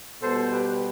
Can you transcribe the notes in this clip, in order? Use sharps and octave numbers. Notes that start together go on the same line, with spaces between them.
B2 G3 A4 C5
G4 B4